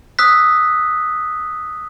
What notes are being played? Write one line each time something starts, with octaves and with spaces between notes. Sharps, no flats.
D#6 E6 F#6 B6